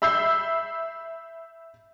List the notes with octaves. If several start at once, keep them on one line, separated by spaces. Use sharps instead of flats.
E5 B5 E6 G6 C7